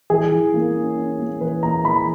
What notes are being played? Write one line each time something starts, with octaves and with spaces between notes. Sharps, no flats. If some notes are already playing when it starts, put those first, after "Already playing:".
E3 G#4
E3
A#3
C#4
C#4
A#3
E3 B4
A#3 A#5
E3 B5